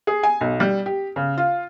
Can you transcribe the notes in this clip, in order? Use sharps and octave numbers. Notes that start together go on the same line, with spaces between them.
G#4
G#5
B1
G3
G4
C#3
F4